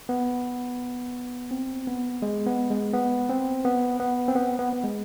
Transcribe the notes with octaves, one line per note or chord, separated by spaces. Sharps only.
B3
C4
B3
G#3
B3
G#3
B3
C4
B3
B3
C4
B3
B3
B3
G#3